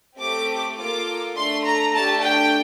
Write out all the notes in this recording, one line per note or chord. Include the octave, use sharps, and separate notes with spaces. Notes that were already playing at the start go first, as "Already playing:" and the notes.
A3 C4 G4 D6
A#3 F4 A4 D6
A3 D4 A4 C6
A#5
A3 D4 G4 A5
G5